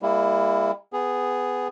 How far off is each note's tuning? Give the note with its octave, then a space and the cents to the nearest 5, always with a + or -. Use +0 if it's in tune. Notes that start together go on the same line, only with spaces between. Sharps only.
G3 +40 A#3 +0 E4 +0
B3 +15 G#4 -5